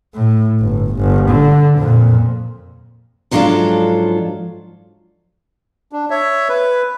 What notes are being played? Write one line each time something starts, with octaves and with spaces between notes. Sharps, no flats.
A2
G1
G1
D3
F2 A#2
G#2 F3 F#3 D4 F4 A4
D4
C#5 E5
B4